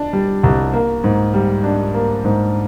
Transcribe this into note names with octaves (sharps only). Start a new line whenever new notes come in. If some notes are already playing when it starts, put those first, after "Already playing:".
Already playing: D4
G3
C2
A#3
G#2
G3
D4
A#3
G#2